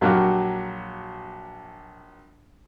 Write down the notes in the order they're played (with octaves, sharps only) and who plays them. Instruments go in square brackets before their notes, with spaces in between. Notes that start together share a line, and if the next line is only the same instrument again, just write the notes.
[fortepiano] A#1 F#3 A#3 F#4 G4 F6